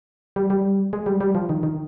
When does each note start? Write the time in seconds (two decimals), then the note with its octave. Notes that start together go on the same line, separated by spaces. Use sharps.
0.36 G3
0.50 G3
0.93 G#3
1.06 G3
1.21 G3
1.35 F3
1.49 D#3
1.63 D#3